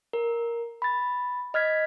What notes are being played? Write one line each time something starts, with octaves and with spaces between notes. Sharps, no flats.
A#4
B5 A6
D#5 F6 G#6 B6